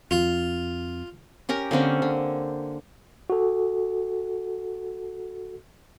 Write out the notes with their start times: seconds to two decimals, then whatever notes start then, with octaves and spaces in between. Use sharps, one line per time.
0.11 F2 F4
1.49 C#4 G4 A#4 A#5
1.71 D3 A#3 C4 C#4
2.02 D3
3.30 F#4 A4